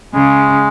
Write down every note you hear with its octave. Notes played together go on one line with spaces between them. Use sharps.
C#3 G#3